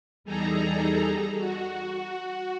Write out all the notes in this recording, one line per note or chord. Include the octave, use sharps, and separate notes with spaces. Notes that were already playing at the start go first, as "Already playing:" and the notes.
E2 G3 D#4 G#4 A4 A#5
F#4